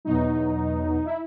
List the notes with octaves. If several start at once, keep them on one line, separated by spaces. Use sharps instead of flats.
E2 B2 F#3 D#4
E4